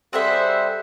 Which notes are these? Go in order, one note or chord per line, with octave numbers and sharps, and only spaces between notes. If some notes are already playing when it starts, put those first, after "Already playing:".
G3 C4 G#4 A4 C5 E5 F#5